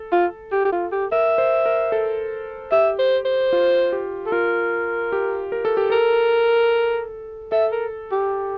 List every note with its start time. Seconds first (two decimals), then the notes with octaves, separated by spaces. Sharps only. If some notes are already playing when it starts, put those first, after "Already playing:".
Already playing: A4
0.12 F4
0.52 G4
0.65 G4
0.72 F4
0.92 G4
1.12 A#4 E5
1.38 C5
1.66 A#4
1.92 A4
2.72 G4 E5
2.99 C5
3.25 C5
3.53 F4
3.93 G4
4.26 A4
4.32 F4 A#4
5.12 G4
5.52 A#4
5.65 A4
5.77 G4
5.90 A4 A#4
7.52 A4 E5
7.72 A#4
8.12 G4